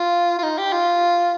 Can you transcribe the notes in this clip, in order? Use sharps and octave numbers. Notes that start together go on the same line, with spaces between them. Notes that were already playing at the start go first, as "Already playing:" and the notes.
Already playing: F4
F4
D#4
G4
F4